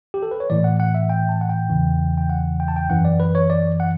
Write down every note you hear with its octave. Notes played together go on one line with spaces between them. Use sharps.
G4
A4
B4
C#5
A2 E3 D5
F#5
F#5
E5
G5
A5
F#5
G5
E2 C#3 E3
G5
F#5
G5
A5
G5
F#2 E3 F#5
D5
B4
C#5
D5
F#5